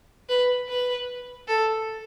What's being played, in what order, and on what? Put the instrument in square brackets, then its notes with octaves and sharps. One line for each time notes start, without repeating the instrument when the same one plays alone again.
[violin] B4
B4
A4